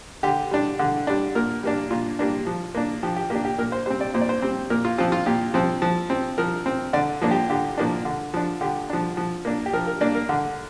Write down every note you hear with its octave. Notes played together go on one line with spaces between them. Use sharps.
D3 G4
G3 D4
D3
G3 D4
A#2 A#4
G3 A#3 D4
A#2 F4
G3 A#3 D4
F3
A#3 D4
F3 G4
G4
A#3 D4 G4
G4
A#2 A#4
C5
G3 C4 C5
D5
A#2 C5
D5
C5
G3 C4
A#2 A#4
F4
F3 C4 F4
F4
A#2 G4
F3 C4
F3
C4
F3 A#4
C4
D3 D5
F3 A#3 D4
G4
D3 G4
F3 A#3 D4
D3
F3 D4
D3 G4
F3 D4
F3
A#3 D4
G4
F3 A#4
A#4
A#3 D4 D5
A#4
D3